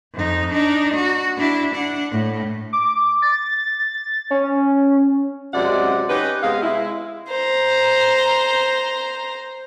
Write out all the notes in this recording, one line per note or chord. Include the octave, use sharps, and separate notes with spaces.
F2 D#4
D4 D#4
F#4
D4 E4
D4 F#5
A2
D6
A6
C#4
F#2 C3 G#3 D5 E5 F#5
C#4 D#4 G4 B4
C3 G#3 B3 G#4 F5
G#3 E4
C5 A#5